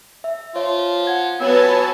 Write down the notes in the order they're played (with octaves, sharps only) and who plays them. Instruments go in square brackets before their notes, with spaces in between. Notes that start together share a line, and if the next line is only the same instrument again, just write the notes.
[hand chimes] E5
[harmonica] F3 F4 [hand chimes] C#5
[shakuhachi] F#5 [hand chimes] G#6
[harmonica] F#3 G#5 E6 [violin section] B3 A5 [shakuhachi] C#5